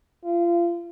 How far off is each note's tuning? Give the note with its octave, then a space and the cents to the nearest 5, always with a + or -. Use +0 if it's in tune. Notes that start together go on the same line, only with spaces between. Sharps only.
F4 -30